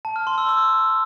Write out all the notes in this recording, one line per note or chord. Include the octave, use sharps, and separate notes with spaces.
A5
F6
C6
E6
E6